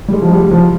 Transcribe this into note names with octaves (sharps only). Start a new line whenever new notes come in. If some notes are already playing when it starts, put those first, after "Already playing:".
G3
G#3
F3
G3
F3